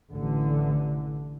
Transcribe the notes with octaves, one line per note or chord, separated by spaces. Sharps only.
A1 D3